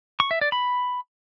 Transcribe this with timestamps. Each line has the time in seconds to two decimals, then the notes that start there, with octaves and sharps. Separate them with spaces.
0.20 C#6
0.31 E5
0.41 D5
0.52 B5